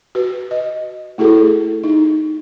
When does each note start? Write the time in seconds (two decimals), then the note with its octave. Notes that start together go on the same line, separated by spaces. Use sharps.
0.15 F#4 B4
0.51 D#5
1.18 A3 E4 F#4 G#4 A4
1.84 D#4